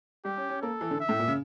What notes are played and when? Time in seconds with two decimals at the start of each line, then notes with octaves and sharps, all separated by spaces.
0.25 G3 G4
0.37 C#4
0.49 C#4
0.62 A#3 A4
0.81 E3
0.91 D3
1.00 E5
1.09 A2
1.19 A#2
1.28 C#3